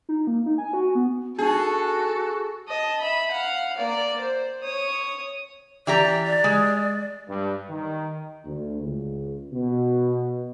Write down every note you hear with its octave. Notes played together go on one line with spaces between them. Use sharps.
D#4
A#3
D#4
G#5
F#4
B3
D4 D#4 F#4 G#4 A4
D#5 A5
E5 B5
F5 F#5
A#3 D5
C5
C#5 D#6
E3 G4 D5 A#5
D5
G#3
G2
D#3
D2
C#2
B2